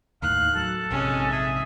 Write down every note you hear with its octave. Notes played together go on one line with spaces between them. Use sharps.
D#2 A2 D#3 F5 F#6
F#3 A4
A#1 G#2 C3 G#3 C#4
G#4 E5